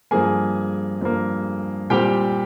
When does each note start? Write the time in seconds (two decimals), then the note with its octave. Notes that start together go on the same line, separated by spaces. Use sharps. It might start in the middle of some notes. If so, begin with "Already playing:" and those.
0.11 G2 F3 A#3 G#4 G#5
1.01 G2 F3 A#3
1.90 A#2 G3 C4 G4 G5